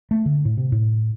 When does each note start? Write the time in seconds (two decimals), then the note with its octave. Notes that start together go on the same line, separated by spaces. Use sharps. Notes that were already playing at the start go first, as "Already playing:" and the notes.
0.11 A3
0.26 D3
0.45 A2
0.57 C3
0.72 A2